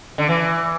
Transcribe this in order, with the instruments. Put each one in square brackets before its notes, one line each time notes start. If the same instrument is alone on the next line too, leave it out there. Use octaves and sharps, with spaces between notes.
[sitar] D3
E3